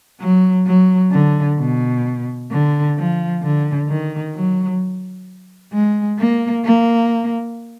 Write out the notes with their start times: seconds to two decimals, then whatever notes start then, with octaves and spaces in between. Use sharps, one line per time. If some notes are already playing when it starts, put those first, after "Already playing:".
0.20 F#3
0.66 F#3
1.12 D3
1.59 B2
2.51 D3
2.97 F3
3.43 D3
3.88 D#3
4.34 F#3
5.73 G#3
6.19 A#3
6.65 A#3